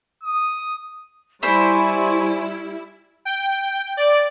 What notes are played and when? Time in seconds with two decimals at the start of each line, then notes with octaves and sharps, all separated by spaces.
0.23 D#6
1.43 G3 E4 C5 D5 G#5 B5 C#6
3.25 G5
3.97 D5